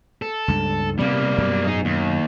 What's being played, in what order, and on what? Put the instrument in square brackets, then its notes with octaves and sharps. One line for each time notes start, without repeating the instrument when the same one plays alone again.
[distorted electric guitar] A4
[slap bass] C#2 G2
[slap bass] C3 B3 [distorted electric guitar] G3 A#3
[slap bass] F#2 B2
[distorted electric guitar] D#4 G#4
D#2